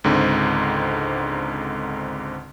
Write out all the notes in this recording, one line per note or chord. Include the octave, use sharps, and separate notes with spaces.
C#2 G#2 D3 C4